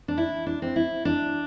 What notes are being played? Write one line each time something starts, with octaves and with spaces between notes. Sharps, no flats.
D4
E4
D4
C4
E4
D4